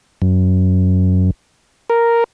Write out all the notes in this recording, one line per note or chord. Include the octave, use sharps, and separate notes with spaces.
F#2
A#4